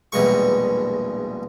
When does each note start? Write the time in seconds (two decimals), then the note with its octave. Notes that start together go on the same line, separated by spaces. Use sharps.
0.12 A#1 E2 G2 B2 G#3 C#6